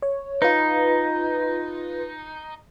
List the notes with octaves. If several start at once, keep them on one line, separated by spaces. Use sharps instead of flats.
C#5
D#4 F4 B4